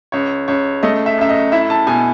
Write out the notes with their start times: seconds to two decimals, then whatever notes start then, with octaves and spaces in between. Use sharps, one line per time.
0.12 C#2 C#5
0.48 C#2 C#5
0.83 A3 D#5
1.06 E5
1.18 F#2 E5
1.29 D#5
1.52 E4 E5
1.70 A5
1.87 B2 G#5